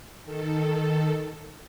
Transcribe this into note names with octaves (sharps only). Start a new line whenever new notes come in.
D#3 A4